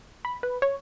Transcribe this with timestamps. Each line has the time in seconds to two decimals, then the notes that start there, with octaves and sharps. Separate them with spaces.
0.25 B5
0.43 B4
0.62 C#5